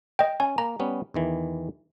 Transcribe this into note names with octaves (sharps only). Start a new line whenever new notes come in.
D#5 G5
C#4 G#5
A#3 A#5
G3 B3 C#4
E2 D#3 E3